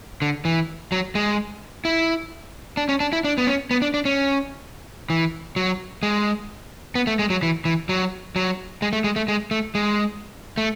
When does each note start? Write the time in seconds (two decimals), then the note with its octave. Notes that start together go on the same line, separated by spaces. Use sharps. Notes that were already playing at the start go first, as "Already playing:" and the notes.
0.22 D3
0.45 E3
0.92 F#3
1.15 G#3
1.85 E4
2.77 D4
2.89 C#4
3.00 D4
3.13 E4
3.24 D4
3.38 B3
3.47 C#4
3.71 B3
3.82 D4
3.94 D4
4.05 C#4
5.10 E3
5.56 F#3
6.03 G#3
6.95 B3
7.07 A3
7.19 G#3
7.30 F#3
7.43 E3
7.65 E3
7.89 F#3
8.36 F#3
8.82 G#3
8.93 A3
9.04 G#3
9.16 A3
9.28 G#3
9.51 A3
9.75 G#3
10.58 A3